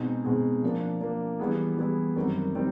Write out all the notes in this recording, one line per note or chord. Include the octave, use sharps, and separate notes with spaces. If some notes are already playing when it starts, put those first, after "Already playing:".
Already playing: B2 G#3 C4 D#4 G#4
B2 G#3 C4 D#4 G#4
F3 A#3 D4
F3 A#3 D4
E3 G3 B3 E4 G#4
E3 G3 B3 E4 G#4
F#2 D#3 G3 C4
D#3 G3 C4